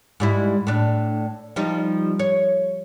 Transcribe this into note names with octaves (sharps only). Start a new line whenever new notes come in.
G#2 G3 E4
A2 D4
F3 G3 D#4
C#5